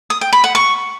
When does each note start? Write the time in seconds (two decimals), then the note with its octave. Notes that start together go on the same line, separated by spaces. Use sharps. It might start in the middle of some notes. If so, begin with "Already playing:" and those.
0.10 D#6
0.21 G5
0.33 B5
0.44 F#5
0.55 C#6